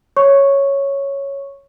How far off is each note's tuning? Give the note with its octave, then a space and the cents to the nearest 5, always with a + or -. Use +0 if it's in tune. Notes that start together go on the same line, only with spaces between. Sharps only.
C#5 +0 C#6 -5